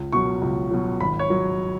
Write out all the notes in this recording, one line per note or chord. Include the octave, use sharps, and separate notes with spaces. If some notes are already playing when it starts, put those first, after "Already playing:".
Already playing: C#2
B2 F#3 C#6
C#2
B2 F#3
G#1 B5
C#5
F#3